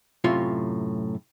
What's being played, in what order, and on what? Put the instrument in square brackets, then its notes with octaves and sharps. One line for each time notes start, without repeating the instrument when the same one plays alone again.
[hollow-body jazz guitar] F#2 A2 C3 F4 C#5